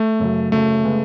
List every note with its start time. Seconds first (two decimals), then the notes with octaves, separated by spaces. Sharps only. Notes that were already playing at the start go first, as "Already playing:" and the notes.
Already playing: A3
0.20 F#2 C#3 F#3
0.52 F#2 C#3 F#3 A3
0.85 C#3 G#3 B3